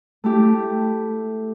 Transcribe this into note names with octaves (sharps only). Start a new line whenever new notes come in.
A3 E4 G4